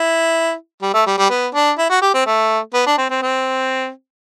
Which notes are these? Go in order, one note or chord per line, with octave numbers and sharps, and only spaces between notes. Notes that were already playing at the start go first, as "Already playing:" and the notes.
Already playing: E4
G3
A3
G3
G3
B3
D4
E4
F#4
G4
C4
A3
B3
D4
C4
C4
C4